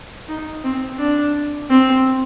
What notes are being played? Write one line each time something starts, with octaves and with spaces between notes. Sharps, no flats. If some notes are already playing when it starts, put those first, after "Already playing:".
D#4
C4
D4
C4